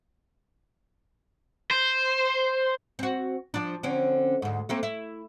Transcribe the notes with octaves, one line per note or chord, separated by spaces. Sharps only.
C5
C4 F#4
F3 D4
D3 C4 C#4
D2 G#2
A3 A#3 C4
E4